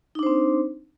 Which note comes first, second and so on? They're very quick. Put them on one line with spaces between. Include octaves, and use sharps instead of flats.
D#4 D4 C5 C4